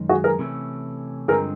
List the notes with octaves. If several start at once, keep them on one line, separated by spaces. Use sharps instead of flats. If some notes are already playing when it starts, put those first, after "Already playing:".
Already playing: F#2 D#3 G#3 C#4
F#4 G#4
G#4 A#4
C3 E3 A3 C#4
G2 D3 F3 G#3 C4 G#4 A#4